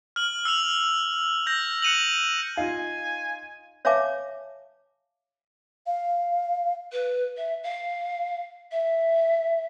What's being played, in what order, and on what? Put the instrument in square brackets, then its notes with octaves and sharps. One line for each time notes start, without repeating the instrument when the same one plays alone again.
[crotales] F6 F#7
E6 F6 F7 F#7
E6 G6 A#6
F#6 C#7 D#7 F7 F#7
[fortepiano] D#4 F4 [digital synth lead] F5 [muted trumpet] G#5
[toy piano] C#5 E5 F5 G#5 A5 D6
[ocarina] F5
[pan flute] B4
E5
F5
E5